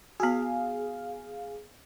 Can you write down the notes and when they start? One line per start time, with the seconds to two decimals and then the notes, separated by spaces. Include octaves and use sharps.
0.20 B3 F#4 G#4 F5